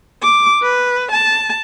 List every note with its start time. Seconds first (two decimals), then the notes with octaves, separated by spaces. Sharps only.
0.23 D6
0.63 B4
1.12 A5